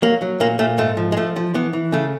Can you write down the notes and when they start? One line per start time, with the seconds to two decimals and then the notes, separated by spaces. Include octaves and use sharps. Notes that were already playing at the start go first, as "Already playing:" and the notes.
0.02 F#3 A#3
0.22 F#3
0.40 A#2 A#3
0.59 A#2 A3
0.78 G#2 A3
0.97 F3
1.12 G#3
1.17 F3 A3
1.36 F3
1.54 E3 B3
1.73 E3
1.92 C#3 A3